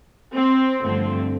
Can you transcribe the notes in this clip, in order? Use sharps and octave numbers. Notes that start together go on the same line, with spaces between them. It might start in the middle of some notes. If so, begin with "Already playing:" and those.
C4
G2 D3 F3 A3 C4